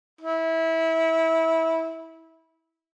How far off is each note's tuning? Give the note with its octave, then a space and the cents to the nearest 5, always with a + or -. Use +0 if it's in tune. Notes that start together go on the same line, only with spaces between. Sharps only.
E4 -20